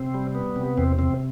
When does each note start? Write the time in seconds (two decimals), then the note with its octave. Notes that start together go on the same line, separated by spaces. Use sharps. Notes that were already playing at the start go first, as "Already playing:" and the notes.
Already playing: C3 C4
0.14 G3
0.35 B3
0.56 C3
0.77 E2 C4
0.99 C3 C4